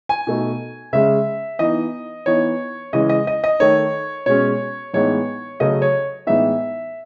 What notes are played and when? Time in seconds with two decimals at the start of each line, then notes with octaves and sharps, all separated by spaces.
0.09 G#5
0.27 B2 A3 D#4
0.93 C#3 G#3 C#4 E5
1.59 E3 B3 D#4 D#5
2.26 E3 B3 D#4 C#5
2.93 C#3 E3 G#3 C#4 D#5
3.09 D#5
3.27 D#5
3.44 D#5
3.60 D#3 A3 D#4 C#5
4.26 B2 G#3 C#4 C#5
4.94 A2 E3 G#3 B3 D#4 C#5
5.60 C#3 F#3 A3 D#5
5.82 C#5
6.27 A2 E3 G#3 B3 D#4 E5